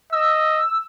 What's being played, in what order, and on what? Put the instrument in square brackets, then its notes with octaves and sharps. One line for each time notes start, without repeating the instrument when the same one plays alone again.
[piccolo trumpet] D#5 [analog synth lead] E6